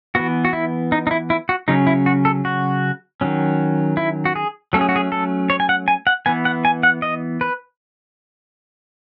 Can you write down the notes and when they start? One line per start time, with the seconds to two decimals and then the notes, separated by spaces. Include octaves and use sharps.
0.15 E3 B3 F#4
0.45 F#4
0.53 E4
0.92 D#4
1.07 D#4
1.11 E4
1.30 E4
1.49 F#4
1.68 C#3 F#3 C#4 D#4
1.87 E4
2.06 F#4
2.25 A4
2.45 F#4
3.21 D#3 F#3 C#4
3.97 E4
4.25 F#4
4.35 G#4
4.73 F#3 A3 C#4 A4
4.81 G#4
4.89 F#4
4.96 G#4
5.12 A4
5.50 C#5
5.60 G#5
5.69 F#5
5.88 G#5
6.07 F#5
6.26 E3 B3 G#5
6.45 F#5
6.65 G#5
6.83 F#5
7.02 D#5
7.41 B4